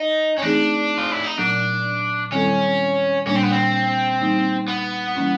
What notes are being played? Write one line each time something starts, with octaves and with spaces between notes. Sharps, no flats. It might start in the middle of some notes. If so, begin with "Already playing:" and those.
Already playing: D#4
C#4
E3 A3 C4 D4 D#4 G#4
F4
E4
D#4
A#2 F#3 B3 D4
D#3 G3 C4 C#4 E4 A4
A#2 G3 A#3 C#4 D4
C4
B3
C4
E3 G3 A#3 D#4
B3
E3 G3 A#3 C#4 E4